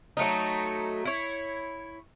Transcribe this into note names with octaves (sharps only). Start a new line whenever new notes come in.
F#3 A3 D#4
E4 C#5